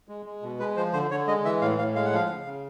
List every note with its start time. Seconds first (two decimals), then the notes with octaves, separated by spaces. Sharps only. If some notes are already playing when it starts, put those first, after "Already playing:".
0.09 G#3
0.26 G#3
0.43 B2
0.59 G#3 B4
0.76 F3 C5
0.93 D3 C5
1.11 D3 C#5
1.27 G#3 D#5
1.45 E3 E5
1.62 A2 F5
1.79 A2 F5
1.95 G#3 F5
2.05 F#5
2.13 F3 F5
2.29 C#3
2.46 C#3